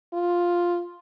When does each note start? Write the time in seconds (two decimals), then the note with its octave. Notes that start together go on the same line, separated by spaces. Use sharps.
0.14 F4